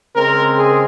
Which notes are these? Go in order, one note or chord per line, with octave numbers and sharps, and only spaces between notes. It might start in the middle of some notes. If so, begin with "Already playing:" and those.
C#3 G#3 C4 A#4
G#4